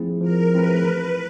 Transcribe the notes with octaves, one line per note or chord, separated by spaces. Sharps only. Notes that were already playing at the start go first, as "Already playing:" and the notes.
Already playing: F3 A3 C4 E4 G#4
F3 A#4
A3 C4 E4 G#4 B4
E3 B4